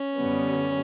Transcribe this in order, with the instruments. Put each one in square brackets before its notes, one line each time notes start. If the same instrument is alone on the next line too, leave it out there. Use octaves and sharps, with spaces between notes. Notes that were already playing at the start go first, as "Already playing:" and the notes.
Already playing: [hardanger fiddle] C#4
[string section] F#2 D3 G3 B3